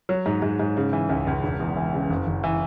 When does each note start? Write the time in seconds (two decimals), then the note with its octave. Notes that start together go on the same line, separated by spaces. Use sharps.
0.09 F#3
0.26 G#2
0.42 G#2
0.59 G#2
0.77 C#3
0.93 E3
1.09 C#2
1.27 C#2
1.44 E1
1.60 E2
1.76 E3
1.94 C#3
2.10 F#1
2.27 F#1
2.44 E3